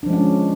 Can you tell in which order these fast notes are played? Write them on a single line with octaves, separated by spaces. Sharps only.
D4 F3 G#3 C#4